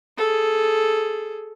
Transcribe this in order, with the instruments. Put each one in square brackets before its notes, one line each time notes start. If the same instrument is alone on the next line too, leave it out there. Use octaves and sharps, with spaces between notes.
[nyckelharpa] G#4 A4